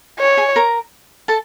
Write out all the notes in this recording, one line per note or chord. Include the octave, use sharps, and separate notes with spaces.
C#5
G#4 G#5
A#4 A#5
A4 A5